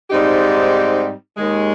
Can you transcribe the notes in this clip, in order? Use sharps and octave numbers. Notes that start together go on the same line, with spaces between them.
G#2 G3 C4 D#4 G4
D#2 D#3 G#3